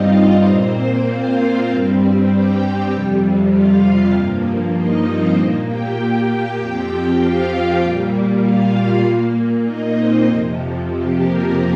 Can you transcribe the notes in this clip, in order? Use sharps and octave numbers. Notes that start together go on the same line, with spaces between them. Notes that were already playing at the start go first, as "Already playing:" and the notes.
Already playing: G2 G3 C4 D#4 F4 D#5 F5
D#4 D#5
A#2 A#3 C4 C5
F4 F5
G2 G3 C4
G4 G5
F2 C3 G3
F4 F5
G2 F3 A#3
D#4 D#5
C4 C5
A#2 A#3
G4 G5
F2 F3 C4 G4 G5
F4 F5
A#2 G3 A#3
F4 F5
A#2 A#3
D#4 D#5
C4 C5
F2 C3 F3
G4
A#3 A#4